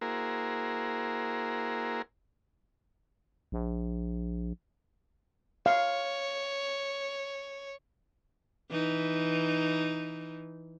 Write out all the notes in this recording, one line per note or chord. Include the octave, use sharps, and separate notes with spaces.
A#3 E4 F#4 G#4 A#4 C5
A#1
C#5 F5
E3 D#4